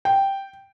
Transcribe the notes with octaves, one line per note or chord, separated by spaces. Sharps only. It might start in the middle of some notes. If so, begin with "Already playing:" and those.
G5